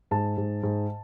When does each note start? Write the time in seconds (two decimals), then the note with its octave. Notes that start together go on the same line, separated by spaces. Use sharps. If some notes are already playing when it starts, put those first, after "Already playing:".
0.11 G#2 A5
0.37 G#2
0.63 G#2